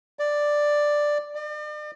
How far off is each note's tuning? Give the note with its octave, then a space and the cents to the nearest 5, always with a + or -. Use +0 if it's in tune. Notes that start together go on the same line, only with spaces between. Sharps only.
D5 +5
D5 +40